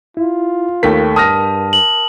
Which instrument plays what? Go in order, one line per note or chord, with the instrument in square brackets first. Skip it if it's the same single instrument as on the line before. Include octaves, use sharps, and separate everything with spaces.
[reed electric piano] E4 [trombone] F4
[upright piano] D#2 A3 B6 [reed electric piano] A#4 G5
[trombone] G2 [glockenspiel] A5 [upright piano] D#6 F6 A#6
[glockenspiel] F#7